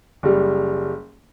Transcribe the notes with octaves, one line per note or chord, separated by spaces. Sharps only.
F#1 G3